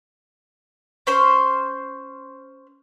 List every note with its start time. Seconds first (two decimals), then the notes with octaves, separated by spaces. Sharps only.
1.07 C#4 C5 C6